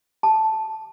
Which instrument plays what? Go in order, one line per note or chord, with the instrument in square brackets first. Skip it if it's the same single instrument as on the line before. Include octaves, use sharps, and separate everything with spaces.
[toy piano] A5